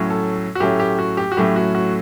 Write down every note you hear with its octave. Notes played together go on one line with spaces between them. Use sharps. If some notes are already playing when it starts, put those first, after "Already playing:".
Already playing: A2 F#3 A3 C#4
A4
F#4
A2 F#3 A3 C#4 G4
G4
F#4
G4
F#4
A2 F#3 A3 C#4 G4
F#4
F#4